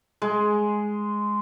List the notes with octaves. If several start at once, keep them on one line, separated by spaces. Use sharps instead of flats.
G#3